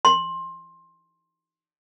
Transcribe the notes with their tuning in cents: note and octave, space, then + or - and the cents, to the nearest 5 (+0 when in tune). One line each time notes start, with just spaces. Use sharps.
C6 +20